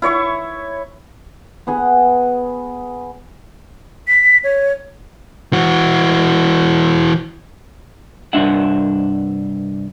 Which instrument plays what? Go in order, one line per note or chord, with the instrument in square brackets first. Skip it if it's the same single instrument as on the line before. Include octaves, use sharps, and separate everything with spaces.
[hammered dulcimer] E4 C#5 E5 C#6
B3 G#4 F#5 G#5
[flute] B6
C#5
[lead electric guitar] E3 F#4
[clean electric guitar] C2 G2 D4 E5 F#5